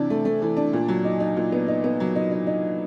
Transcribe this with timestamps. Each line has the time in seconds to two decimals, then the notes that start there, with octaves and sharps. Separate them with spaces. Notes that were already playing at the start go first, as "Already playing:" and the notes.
Already playing: C3 E3 D4
0.10 A3
0.25 A3
0.42 E3
0.57 D4
0.73 A#2
0.88 F#3
1.05 D#4
1.20 D#4
1.37 A#2
1.52 B3
1.68 D#4
1.84 B3
2.00 F#3
2.16 D#4
2.32 D#4
2.47 D#4